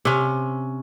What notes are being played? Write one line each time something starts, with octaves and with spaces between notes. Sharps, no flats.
C3 C#4